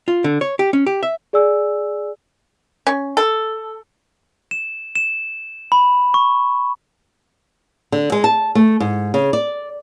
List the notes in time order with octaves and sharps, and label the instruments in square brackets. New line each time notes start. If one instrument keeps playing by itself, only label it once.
[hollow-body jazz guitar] F4
D3
C#5
G4
C#4
G4
E5
[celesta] G#4 D5 G#5 E6
[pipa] C#4
A4
[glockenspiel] E7
E7
B5
C#6
[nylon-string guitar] D3
G#3
A5
A3
G#2
C#3
D5